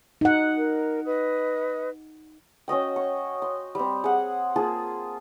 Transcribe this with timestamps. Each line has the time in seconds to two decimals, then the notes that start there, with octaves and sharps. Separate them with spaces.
0.21 D#4 F#5
0.56 A#4
1.05 B4 D#5 D#6
2.68 C#4 F#4 D#5 G5
2.96 C#6
3.42 C6
3.75 G3 C4
4.04 G#4 F#5
4.56 A#3 F4 G#4 A5